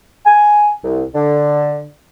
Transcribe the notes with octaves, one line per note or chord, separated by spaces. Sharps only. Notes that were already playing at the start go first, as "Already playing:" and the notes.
G#5
C2
D3